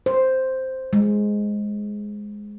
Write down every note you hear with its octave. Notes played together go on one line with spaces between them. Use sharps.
C5
G#3